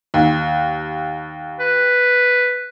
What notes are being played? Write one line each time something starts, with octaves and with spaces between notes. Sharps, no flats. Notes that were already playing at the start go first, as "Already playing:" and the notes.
D#2
B4